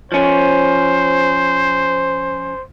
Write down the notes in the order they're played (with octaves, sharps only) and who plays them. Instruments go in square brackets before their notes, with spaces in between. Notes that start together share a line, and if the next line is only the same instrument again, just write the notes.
[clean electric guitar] F3 C#4 [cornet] C5